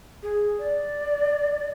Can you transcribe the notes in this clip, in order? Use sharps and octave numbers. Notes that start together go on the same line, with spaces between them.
G#4
D5